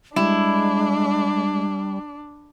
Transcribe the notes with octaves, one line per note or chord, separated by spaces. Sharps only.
G3 G#3 D4 E4